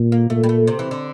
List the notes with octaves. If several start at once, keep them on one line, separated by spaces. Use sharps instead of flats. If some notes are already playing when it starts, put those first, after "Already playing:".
Already playing: A#2
A#3
A#2 A3
G3
A3
C3
E3
D3